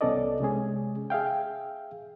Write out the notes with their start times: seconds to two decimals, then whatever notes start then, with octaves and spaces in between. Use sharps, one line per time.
0.01 C2 B3 C#4 A4 D5 D#5
0.40 C3 G#3 C#4 G#4
1.10 G#4 E5 F5 G5